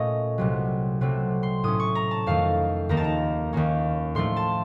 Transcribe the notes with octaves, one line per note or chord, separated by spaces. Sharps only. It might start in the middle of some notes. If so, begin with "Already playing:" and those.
Already playing: A#2 A3 C#4 D#5
C2 C3 F#3
C3 F#3 A3 C4
C6
A2 A3 C#4 D#6
C#6
A#5
A5
F2 D#3 A3 F5
D#2 D#3 A#3 A#5
A5
A#5
D#2 D#3 A#3 C#4
A2 F3 A3 C6
A5